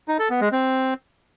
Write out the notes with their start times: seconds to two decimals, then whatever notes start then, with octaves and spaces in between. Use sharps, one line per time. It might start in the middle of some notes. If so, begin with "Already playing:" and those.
0.08 D#4
0.19 A4
0.30 B3
0.41 G#3
0.52 C4